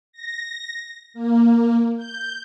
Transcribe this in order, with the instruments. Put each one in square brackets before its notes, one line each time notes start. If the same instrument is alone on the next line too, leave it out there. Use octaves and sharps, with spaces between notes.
[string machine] A#6
A#3
G6